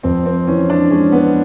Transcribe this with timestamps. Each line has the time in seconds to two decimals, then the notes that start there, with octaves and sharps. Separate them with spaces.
0.03 F2 C4
0.26 C4
0.48 E3 C#4
0.70 D4
0.90 G#3 C#4
1.12 B3